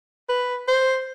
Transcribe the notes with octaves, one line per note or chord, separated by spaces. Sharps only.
B4
C5